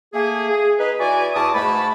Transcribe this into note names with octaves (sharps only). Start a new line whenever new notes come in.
A3 A#3 G#4
G#4
D#4 G#4 B4
E3 F#4 D5 G#5
E2 F#4 A5 D6 D#6
G#2 A3 E4 A5 B5